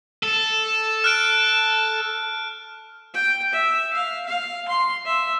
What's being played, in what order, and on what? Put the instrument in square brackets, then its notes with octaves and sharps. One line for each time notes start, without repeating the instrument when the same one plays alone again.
[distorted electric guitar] A4
[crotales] F6 F#6 D7
[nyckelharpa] G5
E5
F5
F5
C6
E5